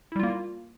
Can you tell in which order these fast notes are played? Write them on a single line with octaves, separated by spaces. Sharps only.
E4 G3 F4 A#3